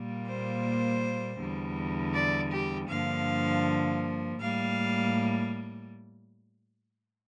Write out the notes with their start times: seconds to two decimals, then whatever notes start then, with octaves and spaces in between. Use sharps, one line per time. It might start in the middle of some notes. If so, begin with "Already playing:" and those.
Already playing: A#2 G3 A#3
0.27 C5
1.40 E2 D3 G3
2.14 D5
2.52 G4
2.89 G2 D3 F3 A#3 F5
4.40 A2 G3 A#3 F5